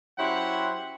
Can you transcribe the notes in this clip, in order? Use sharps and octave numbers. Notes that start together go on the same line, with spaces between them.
F#3 C#4 E4 G4 C5 F#5